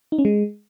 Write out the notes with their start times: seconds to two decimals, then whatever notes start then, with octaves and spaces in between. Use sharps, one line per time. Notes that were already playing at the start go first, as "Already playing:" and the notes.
0.12 D#4
0.18 C#4
0.25 G#3